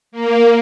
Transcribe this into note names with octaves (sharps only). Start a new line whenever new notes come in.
A#3